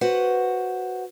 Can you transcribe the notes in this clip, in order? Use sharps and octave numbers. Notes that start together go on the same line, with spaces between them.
F#4 B4 C5 F#5